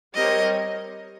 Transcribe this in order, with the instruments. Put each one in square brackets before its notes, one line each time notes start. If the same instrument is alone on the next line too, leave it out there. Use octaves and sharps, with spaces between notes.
[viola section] G3 C4 G4 A#4 C#5 [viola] D#5